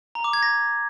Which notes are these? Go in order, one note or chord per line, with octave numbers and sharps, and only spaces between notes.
A#5
D6
G#6
A#6